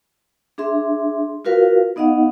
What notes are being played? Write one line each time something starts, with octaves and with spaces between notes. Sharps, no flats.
D4 G#4 E5 C6
F4 F#4 A#4 B4 F5
B3 D#4 D#5 F5 F#5